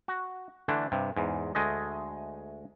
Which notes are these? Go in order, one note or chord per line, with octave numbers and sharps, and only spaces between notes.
F#4
D3 E3 A3 D4
G2 C3
E2 G#2
D2 G#3 A3 D#5